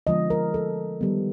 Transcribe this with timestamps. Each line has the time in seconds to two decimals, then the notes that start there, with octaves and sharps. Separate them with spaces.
0.07 D3 F3 G#3 B3 D#5
0.30 A#4
0.54 A4
1.01 D#3 G3 B3